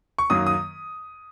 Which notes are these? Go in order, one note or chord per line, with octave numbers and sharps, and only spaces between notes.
C#6
F#2 D#3 F#3 A#3 D#6
D#6